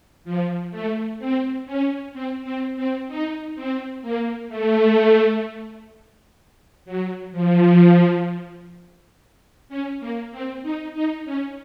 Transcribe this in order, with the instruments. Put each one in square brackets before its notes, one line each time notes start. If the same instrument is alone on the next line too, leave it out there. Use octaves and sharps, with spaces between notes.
[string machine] F3
A3
C4
C#4
C4
C4
C4
D#4
C4
A#3
A3
F#3
F3
C#4
A#3
C4
D#4
D#4
C#4